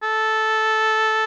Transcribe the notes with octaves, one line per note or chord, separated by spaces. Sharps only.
A4